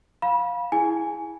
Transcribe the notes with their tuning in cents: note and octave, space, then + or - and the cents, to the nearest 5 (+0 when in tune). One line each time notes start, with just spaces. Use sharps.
F5 +15 B5 -25
E4 +0 G#4 +0 G#5 +0